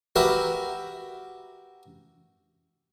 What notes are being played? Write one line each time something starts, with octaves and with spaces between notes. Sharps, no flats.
F#4 G4 A#4 B4 E5